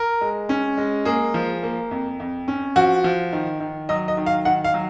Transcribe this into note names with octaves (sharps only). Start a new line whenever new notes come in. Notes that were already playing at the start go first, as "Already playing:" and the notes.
Already playing: A#4
G#3
C#4
G#3
A#3 G#4
F3
A#3
F2
F2
C#4
F3 F#4
F3
D#3
D#3
F#3 D#5
D#5
D#3
F5
D#3 F#5
F5
F#3